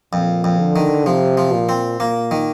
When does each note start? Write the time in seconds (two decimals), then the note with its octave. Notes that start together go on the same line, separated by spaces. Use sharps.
0.13 F2 A#2
0.44 F2
0.59 D3
0.76 D#3
1.06 C3 F3
1.37 F3
1.53 A#2
1.69 C4
2.00 A#2 A#3
2.31 D#3